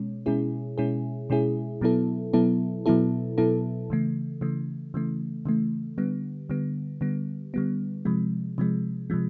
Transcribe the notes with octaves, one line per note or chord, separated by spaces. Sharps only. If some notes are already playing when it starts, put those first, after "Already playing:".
Already playing: B2 G#3 C#4
B2 G#3 C#4 E4 G#4
B2 G#3 C#4 E4 G#4
B2 G#3 C#4 E4 G#4
B2 F#3 B3 E4 A4
B2 F#3 B3 E4 A4
B2 F#3 B3 E4 A4
B2 F#3 B3 E4 A4
C#3 E3 A3
C#3 E3 A3
C#3 E3 A3
C#3 E3 A3
D3 G3 B3
D3 G3 B3
D3 G3 B3
D3 G3 B3
C3 F3 G#3
C3 F3 G#3
C3 F3 G#3